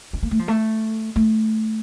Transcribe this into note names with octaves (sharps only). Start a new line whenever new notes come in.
D4
A#3
A3
F3
A3
A3